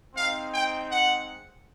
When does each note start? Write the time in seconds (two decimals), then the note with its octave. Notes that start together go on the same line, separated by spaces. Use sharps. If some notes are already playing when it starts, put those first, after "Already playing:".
0.14 G#3 C4 D#4 F5
0.51 G5
0.89 F#5